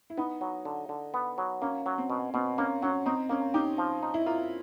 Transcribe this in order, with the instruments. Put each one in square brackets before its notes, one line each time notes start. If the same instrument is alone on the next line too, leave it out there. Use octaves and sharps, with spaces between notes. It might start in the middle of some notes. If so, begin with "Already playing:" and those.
[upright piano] E4
[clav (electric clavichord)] B3 [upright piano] D#4
[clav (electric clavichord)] F#3
D3
D3
B3
F#3
[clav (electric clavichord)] A#3 [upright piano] C#4
[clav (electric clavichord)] F#3
[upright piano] C4
[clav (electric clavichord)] B2
[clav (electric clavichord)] B2 [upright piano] C4
[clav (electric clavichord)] A#3 [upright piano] C#4
[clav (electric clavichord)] F#3 [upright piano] C#4
[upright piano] C4 [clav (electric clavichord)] D#4
[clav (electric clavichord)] A#3 [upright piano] C#4
[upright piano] D#4 [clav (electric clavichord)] G4
[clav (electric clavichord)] F3
D#4
[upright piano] E4
[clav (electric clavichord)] A#3 [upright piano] F4